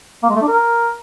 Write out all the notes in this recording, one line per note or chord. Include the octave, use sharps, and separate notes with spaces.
A#3
G#3
A3
D4
A#4